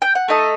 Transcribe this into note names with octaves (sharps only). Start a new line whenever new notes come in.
G5
F#5
A3 D#4 A4 D#5